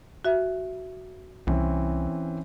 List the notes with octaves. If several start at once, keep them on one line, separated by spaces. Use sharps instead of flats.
F#4 E5
C2 E3 C4 C#4